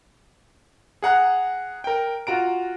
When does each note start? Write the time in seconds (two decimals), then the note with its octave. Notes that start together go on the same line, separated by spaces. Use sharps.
1.02 G#4 F#5 A#5 F#6
1.84 A#4 G5
2.27 F4 F#4 A#5 D7